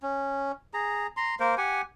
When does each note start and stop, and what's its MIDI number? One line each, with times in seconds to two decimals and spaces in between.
0.02 0.52 61
0.74 1.07 68
0.74 1.07 82
1.17 1.35 82
1.17 1.35 84
1.40 1.55 58
1.40 1.55 70
1.40 1.55 72
1.58 1.82 67
1.58 1.82 78
1.58 1.82 80